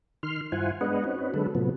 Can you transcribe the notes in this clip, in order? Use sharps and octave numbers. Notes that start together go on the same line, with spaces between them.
D#3 C6 F6
G2 E4 F4 C5 F#5 G#5
G#3 B3 D4 B4 D#5 F#5
C4 C#4 D#4 F#4 B4
D3 F#3 G#3 A4 B4
A2 C3 F3 F#3 B3